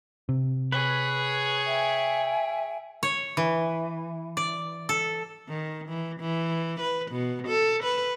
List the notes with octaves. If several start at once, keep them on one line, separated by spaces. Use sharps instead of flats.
C3
G#4 B4 C#5
E5 G5 G#5
C#5
E3
D5
A4
D#3
E3
E3
B4
B2
A4
B4